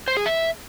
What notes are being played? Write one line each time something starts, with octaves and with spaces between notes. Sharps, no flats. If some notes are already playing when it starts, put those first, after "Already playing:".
C5
G#4
E5